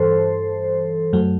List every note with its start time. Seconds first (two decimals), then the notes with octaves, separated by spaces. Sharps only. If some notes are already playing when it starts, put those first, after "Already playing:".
Already playing: G2 E3 A4 C5
1.13 F#2 F#3 A3